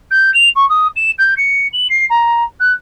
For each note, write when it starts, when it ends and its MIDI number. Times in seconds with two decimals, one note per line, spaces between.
0.11 0.33 91
0.34 0.48 101
0.55 0.67 85
0.69 0.87 87
0.96 1.11 100
1.18 1.34 91
1.37 1.67 97
1.73 1.87 102
1.89 2.05 96
2.10 2.43 82
2.60 2.72 90